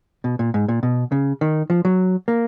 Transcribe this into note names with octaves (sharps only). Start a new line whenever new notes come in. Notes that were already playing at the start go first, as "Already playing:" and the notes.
B2
A#2
G#2
A#2
B2
C#3
D#3
F3
F#3
A#3